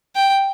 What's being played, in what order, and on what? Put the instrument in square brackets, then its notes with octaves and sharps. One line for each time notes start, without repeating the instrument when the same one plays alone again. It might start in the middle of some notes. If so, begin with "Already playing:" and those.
[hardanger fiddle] G5